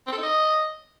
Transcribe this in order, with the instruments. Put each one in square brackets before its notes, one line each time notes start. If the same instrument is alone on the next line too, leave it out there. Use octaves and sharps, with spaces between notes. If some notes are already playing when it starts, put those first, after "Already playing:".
[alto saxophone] C4
A4
D#4
D#5